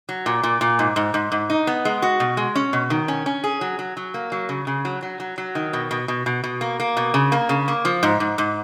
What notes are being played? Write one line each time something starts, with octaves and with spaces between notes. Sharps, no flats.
F#3
A#2
A#2
A#2
G#2
G#2
G#2
G#2
D#4
B3
G#3
F#4
B2
G#3
C#4
B2
D#3
C#4
C#4
G#4
F#3
F#3
F#3
A#3
F#3
C#3
C#3
F#3
F#3
F#3
F#3
D#3
B2
B2
B2
B2
B2
A#3
A#3
B2
C#3
A#3
C#3
A#3
F3
G#2
G#2
G#2